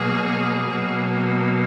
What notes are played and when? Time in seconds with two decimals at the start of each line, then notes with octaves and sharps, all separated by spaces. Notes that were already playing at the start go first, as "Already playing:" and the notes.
Already playing: B2 F#3 A#3 G#4
0.67 B2 F#3 A#3